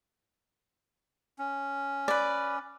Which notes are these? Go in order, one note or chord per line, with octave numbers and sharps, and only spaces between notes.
C#4
B4 D5